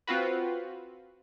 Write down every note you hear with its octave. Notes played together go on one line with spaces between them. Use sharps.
C4 F4 F#4 B4